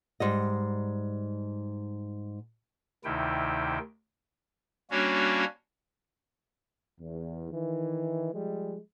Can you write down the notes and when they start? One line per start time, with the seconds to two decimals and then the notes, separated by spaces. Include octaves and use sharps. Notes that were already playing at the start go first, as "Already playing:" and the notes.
0.20 G#2 G3 D#5
3.04 D2 C3 D#3 D#4 E4 G5
4.91 G3 A#3 C#4 D4 F#4 C#5
7.00 E2
7.51 D#3 E3
8.33 F3 G3 G#3